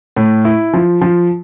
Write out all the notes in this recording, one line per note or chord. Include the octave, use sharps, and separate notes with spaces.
A2
E4
F3
F3